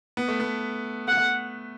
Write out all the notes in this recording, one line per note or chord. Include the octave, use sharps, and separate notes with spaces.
B3
A3
B3
F#5